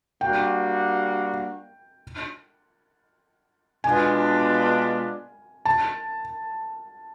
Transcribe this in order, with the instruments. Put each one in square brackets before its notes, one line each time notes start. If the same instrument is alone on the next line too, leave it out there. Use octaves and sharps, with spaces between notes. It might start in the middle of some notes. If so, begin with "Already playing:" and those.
[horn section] G3 A#3 D4 F#4 [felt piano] G5
[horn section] B2 G#3 B3 D4 F4 [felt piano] G#5
[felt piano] A5